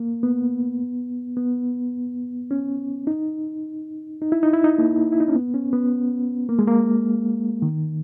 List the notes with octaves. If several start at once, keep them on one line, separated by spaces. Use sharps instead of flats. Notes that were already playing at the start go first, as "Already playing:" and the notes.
Already playing: A#3
B3
B3
C#4
D#4
D#4
E4
D#4
E4
D#4
A#3
E4
D#4
C#4
B3
C#4
B3
A#3
G#3
A#3
D#3